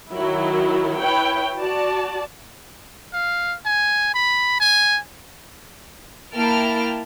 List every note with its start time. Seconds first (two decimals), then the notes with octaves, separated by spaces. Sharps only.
0.11 D#3 F#3 E4
1.00 E4 B4 C#5 G5
1.58 F#4 D5 A5
3.13 F5
3.66 G#5
4.14 B5
4.60 G#5
6.35 A#3 E4 G5 A5 F6 D7